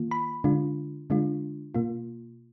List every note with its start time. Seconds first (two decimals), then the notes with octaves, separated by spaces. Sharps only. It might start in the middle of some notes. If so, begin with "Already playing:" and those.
Already playing: D#3 A#3 F4
0.11 B5
0.44 D3 G#3 D4 F4
1.10 D3 G#3 D4 F4
1.75 B2 A#3 F4